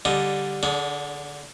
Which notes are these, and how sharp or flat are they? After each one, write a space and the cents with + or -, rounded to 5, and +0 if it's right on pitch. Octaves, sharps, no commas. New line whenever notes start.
D3 -10 G3 +0 D#5 +0
D3 +0 D4 -35 G#4 +20